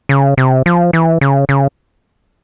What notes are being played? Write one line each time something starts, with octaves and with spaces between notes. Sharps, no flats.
C#3
C3
F3
E3
C#3
C#3